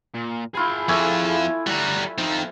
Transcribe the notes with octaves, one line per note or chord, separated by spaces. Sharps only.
A#2
E4 F4 G#4 G5 B5
F2 F3 A3 E4 G#5 D6
G3 F#4 G4 A#5
D#3 F3 C4